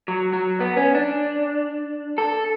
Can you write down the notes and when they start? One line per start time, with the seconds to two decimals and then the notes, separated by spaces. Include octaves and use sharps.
0.08 F#3
0.33 F#3
0.60 B3
0.77 C#4
0.95 D4
2.18 A4